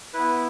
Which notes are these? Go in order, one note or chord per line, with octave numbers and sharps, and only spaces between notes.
B3 E4 B4